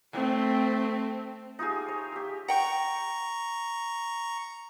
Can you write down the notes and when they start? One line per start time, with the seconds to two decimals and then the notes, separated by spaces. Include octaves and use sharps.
0.13 A3 C4
1.59 D#4 F4 G4 G#4
1.88 C#5
2.12 G4 E6
2.48 F#5 G5 A#5 C#6